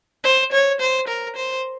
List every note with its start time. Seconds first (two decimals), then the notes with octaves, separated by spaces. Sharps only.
0.24 C5
0.52 C#5
0.80 C5
1.08 A#4
1.36 C5